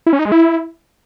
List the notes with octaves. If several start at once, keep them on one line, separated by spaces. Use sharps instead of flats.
E4
C#4
D#4
G#3
E4